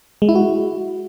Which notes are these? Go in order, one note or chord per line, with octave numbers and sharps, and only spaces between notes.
G#3
E4
F#4